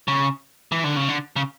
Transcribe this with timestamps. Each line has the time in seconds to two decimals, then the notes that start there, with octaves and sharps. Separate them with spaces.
0.08 C#3
0.72 E3
0.84 D3
0.96 C#3
1.09 D3
1.36 C#3